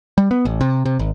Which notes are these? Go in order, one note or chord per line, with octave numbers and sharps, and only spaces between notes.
G3
B3
A1
C3
C3
G#1